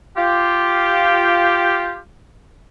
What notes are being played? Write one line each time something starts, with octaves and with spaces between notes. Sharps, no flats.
F4 G4